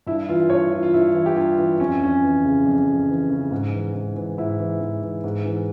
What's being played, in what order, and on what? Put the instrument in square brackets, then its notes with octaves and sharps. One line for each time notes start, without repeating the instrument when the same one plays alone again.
[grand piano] G2 E4
E3 F4
G2 C#5
E3 F4
F4
G2 E4
E3
G4
G2 F4
E3
F2 C#4
F2 C#4
E3
C#3
F2
F2
E3
C#3
G#2
E3
G#2
E3
G#2 E4
E3
G#2
E3
G#2
E3